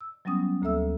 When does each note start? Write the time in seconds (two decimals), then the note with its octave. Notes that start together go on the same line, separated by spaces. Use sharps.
0.01 E6
0.25 F#3 G3 B3 C#4 D#6
0.62 D2 A#3 A4 E5 E6